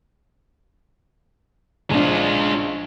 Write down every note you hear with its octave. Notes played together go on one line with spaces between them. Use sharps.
A#1 G#3 D4 F4